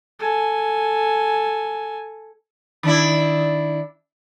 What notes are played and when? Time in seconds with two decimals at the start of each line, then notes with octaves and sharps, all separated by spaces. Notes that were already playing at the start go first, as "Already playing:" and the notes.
0.19 A4 G#5
2.83 D#3 D4 E4